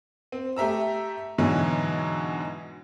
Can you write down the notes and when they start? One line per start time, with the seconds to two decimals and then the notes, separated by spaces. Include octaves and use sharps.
0.32 C4
0.56 A3 G4 E5 A#5 E6
1.38 G#2 B2 D3 E3 F#3